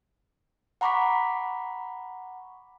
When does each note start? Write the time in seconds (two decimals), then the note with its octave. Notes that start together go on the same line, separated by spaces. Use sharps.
0.81 F#5 A#5 B5 C#6 D6 B6